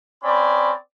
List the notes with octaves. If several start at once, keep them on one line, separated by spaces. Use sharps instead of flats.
C4 C#4 D5 B5